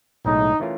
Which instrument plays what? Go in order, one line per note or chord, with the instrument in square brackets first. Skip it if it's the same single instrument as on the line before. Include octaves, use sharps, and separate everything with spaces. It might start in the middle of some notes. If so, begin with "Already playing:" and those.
[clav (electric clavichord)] B1 A2 E3 G#3 [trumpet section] D#4
[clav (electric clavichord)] E3 A3 C#4 F4 A#4